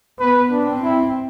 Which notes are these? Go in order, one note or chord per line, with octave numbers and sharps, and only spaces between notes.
B3 B4
D4
C4
E4